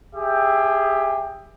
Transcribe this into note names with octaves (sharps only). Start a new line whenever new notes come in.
G4 G#4 E5 G5